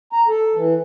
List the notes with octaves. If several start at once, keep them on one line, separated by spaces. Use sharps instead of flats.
A#5
A4
E3